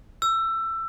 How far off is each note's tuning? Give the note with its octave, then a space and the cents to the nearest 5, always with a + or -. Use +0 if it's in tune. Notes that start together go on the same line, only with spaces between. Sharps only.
E6 +20